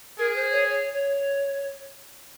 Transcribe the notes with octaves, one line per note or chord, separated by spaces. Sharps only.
G#4 A#4
C5
C#5
C#5
C#5